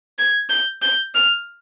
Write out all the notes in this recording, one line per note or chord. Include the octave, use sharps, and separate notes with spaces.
G#6
G6
G6
F6